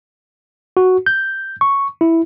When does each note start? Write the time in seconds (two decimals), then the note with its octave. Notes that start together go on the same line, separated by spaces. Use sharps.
0.77 F#4
1.06 G6
1.61 C#6
2.01 E4